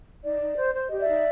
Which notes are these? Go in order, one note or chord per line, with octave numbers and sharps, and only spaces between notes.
D#4 D5
D#4
C5
C5
G4 D#5
D5 E5
D#4